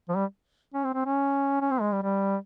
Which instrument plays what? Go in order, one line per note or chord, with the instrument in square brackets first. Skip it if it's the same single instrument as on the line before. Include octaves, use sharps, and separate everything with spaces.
[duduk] F3
G3
C#4
C4
C4
C#4
C#4
C4
G#3
G3
G3